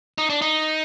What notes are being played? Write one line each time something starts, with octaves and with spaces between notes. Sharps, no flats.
D#4
D4
D#4